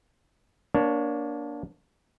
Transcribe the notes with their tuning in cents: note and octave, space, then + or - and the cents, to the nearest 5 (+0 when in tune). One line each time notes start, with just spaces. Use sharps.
A#3 +25 D4 -10 C#5 +0